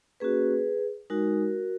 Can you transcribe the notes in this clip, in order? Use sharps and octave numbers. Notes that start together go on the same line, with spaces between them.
A#3 C#4 F#4 G#4 B4
G#3 D#4 F#4 A#4